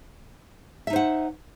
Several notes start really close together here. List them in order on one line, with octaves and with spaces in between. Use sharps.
E5 D#4 C5 F#5